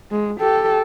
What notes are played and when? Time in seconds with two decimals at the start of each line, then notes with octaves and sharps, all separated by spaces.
0.11 G#3
0.40 G4 A4